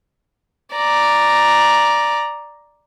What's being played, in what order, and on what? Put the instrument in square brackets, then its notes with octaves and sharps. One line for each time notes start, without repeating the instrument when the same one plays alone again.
[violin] D5 A#5